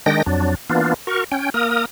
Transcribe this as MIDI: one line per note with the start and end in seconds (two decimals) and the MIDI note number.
0.06 0.22 51
0.06 0.22 56
0.06 0.22 62
0.06 0.22 79
0.06 0.22 94
0.26 0.55 41
0.26 0.55 54
0.26 0.55 62
0.70 0.94 52
0.70 0.94 58
0.70 0.94 59
0.70 0.94 62
0.70 0.94 65
1.07 1.24 66
1.07 1.24 70
1.07 1.24 85
1.32 1.50 61
1.32 1.50 79
1.54 1.85 58
1.54 1.85 70
1.54 1.85 87